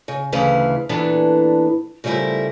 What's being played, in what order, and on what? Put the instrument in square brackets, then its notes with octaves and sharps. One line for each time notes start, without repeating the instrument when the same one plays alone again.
[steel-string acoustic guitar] C#3
D2 C#3 E3 E4 F5
A#2 E3 B3 D4 A4
C#3 F3 G3 A3 E4 A#4